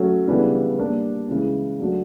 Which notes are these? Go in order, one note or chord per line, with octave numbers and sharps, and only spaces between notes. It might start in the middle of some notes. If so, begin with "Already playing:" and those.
Already playing: F#3 A3 C#4 F#4
C#3 E3 G3 B3 D4
G3 A#3 D4
C#3 E3 G#3 C#4
F#3 A3 D4 F#4